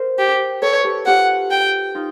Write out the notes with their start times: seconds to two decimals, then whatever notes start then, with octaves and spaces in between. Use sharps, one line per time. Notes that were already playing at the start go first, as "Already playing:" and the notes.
Already playing: F#4 A#4 C5
0.19 G4
0.62 A4 B4 C#5
0.84 G4 A4
1.06 F4 G4 F#5
1.51 G5
1.95 D#4 F4